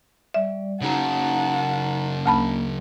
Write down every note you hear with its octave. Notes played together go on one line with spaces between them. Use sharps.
G3 D5 E5
C#3 F#3 D#4 F#5 A5 A#5
D2 A#3 A5 B5